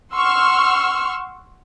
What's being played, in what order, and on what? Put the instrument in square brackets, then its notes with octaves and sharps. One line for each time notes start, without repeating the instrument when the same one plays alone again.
[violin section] F#5 C6 C#6 E6 F6